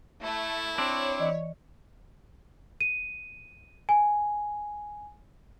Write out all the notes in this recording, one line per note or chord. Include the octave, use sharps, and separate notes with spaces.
A3 E4
C4 D4 C#5
E3 D5 D#5
D#7
G#5